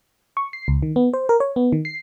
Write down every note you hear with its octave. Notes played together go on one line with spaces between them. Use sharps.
C#6
C7
C#2
D#3
B3
C5
A#4
C#5
B3
D#3
C7